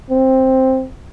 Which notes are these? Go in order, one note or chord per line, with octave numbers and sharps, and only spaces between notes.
C4